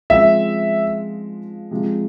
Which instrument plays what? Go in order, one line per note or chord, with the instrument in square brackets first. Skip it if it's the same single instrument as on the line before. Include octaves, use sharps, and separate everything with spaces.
[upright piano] C#3 F3 G#3 C4 [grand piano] E5
[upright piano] C3 F3 G#3